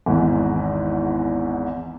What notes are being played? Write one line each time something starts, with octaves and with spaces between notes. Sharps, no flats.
G#1 E2 G#2